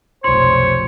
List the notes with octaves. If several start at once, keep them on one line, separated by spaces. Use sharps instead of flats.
F1 B1 C5 C#5 C6